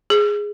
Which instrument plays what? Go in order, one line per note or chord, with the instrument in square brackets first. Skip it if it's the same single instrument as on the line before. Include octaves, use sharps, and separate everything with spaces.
[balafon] G#4